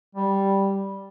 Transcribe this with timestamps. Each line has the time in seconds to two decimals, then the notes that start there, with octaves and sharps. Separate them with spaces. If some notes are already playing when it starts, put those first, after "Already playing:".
0.15 G3